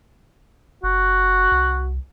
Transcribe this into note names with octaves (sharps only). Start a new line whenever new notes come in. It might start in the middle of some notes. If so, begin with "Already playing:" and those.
F#1 F#4
C2